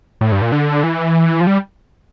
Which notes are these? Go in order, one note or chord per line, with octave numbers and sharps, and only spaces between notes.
A2
G2
A#2
D3
E3
F3
G3